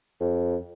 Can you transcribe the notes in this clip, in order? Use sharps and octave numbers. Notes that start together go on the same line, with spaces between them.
F2